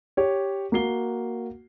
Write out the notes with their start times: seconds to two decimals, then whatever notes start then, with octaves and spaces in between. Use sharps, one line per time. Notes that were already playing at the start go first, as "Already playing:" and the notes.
0.17 G4 C#5
0.72 A#3 F#4 C7 G7